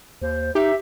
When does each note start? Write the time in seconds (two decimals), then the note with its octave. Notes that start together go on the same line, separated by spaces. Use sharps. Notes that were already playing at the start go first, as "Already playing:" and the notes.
0.22 D#2 C5
0.55 D#4 G4 E5